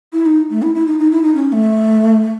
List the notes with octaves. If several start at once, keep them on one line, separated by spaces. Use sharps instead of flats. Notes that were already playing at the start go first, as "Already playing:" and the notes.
E4
D#4
A3
E4
E4
D#4
D#4
E4
D#4
C#4
C#4
A3